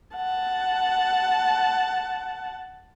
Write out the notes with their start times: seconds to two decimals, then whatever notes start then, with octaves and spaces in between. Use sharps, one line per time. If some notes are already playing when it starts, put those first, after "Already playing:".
0.16 F#5 A5